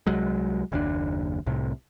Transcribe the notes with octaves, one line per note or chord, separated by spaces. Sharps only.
C2 F#3 G#3
F#1 D#2 D4
C2 A2 C3